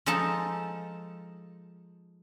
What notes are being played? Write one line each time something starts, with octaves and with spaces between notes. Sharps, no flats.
F3 G#3 D#4 A4 A5